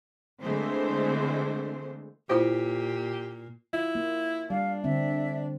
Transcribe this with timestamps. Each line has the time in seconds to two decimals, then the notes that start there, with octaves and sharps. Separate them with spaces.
0.42 D3 E3 G#3 A3 C4 C5
2.30 A#2 E4 F4 G4 C5
3.73 E4 F4
3.95 A#3
4.50 G3 D4 F5
4.84 D3 C4 E5